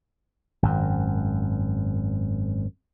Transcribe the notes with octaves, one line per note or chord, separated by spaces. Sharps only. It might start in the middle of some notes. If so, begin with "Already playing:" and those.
G#1 F#2